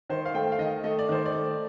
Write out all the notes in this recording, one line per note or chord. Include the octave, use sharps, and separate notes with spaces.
D#3 C5
F5
A3 G5
F5
D#3 D#5
A3 D#5
D5
D#3 C5
D5
A3